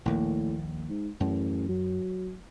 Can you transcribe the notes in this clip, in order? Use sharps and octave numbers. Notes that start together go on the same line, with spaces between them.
A#1 D#2 A2 A#3
G#2
A1 F#2
F#3